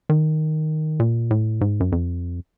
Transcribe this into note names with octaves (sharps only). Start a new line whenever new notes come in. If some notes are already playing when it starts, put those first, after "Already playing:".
D#3
A#2
A2
G#2
F#2
F2